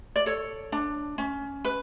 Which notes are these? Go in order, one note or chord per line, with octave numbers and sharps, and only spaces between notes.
D5
A4 C#5
D4
C#4
B4